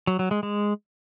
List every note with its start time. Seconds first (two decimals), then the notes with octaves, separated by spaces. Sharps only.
0.07 F#3
0.19 F#3
0.31 G#3
0.43 G#3